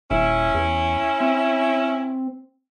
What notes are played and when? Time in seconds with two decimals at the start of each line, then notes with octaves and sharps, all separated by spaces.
0.11 D#1 C#4 E4
0.54 E2
1.21 C4